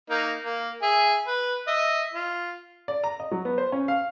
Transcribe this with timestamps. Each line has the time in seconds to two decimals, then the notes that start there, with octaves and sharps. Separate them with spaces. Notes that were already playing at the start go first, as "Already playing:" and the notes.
0.10 A#3 D#4
0.42 A#3
0.82 G#4 E5
1.27 B4
1.67 D#5 E5
2.13 F4
2.88 D5
3.04 A#5
3.20 D#5
3.31 F#3
3.45 B3
3.58 C5
3.72 C#4
3.88 F5